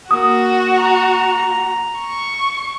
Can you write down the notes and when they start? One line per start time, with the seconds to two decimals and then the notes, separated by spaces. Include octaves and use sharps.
0.11 A#3 F#4 D#6
0.77 A#5
2.00 C#6